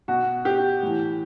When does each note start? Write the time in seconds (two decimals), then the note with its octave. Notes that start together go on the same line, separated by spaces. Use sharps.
0.08 B2 F#4
0.45 G4
0.83 A2 E3